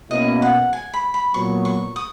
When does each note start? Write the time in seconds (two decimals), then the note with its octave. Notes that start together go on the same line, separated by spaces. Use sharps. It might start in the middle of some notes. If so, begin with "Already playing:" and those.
0.11 B2 A#3 C#4 E4 D#5
0.42 F#5
0.73 G#5
0.93 B5
1.14 B5
1.34 A#2 F#3 B3 C#6
1.65 C#6
1.96 D#6